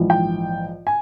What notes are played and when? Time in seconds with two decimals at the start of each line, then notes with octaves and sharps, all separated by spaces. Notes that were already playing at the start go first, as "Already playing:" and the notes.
Already playing: A#1 G#2 E3
0.10 G5
0.87 G#5